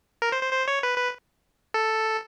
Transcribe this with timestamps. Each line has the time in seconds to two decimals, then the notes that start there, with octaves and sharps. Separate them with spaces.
0.22 A#4
0.32 C5
0.43 C5
0.53 C5
0.68 C#5
0.83 B4
0.98 B4
1.74 A4